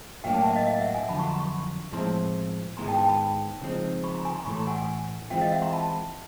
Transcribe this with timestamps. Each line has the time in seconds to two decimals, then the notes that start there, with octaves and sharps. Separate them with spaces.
0.24 A2 F#3 A#3 D4 F5 G5
0.34 G5 A5
0.45 E5 F#5
0.56 D#5 F5
0.66 D#5 F5
0.80 E5 F#5
0.94 F#5 G#5
1.08 F2 D3 F#3 A5 B5
1.19 B5 C#6
1.29 A#5 C6
1.40 B5 C#6
1.92 A2 F3 G#3 C4 E4 A#5 C6
2.77 G#2 D#3 G#3 B3 E4 A#5 C6
2.88 G5 A5
2.98 G5 A5
3.09 A5 B5
3.61 C#3 F3 G#3 C4 D#4
4.04 B5 C#6
4.14 A#5 C6
4.25 G#5 A#5
4.36 A#5 C6
4.46 A2 E3 A3 B5 C#6
4.57 A#5 C6
4.67 F#5 G#5
4.78 F#5 G#5
5.30 E3 G#3 C4 F4 F5 G5
5.41 D#5 F5
5.52 E5 F#5
5.62 A#5 C6
5.73 A5 B5